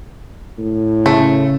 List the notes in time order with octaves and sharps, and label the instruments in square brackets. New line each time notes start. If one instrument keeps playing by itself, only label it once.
[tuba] A2
[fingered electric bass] C#3 [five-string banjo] A3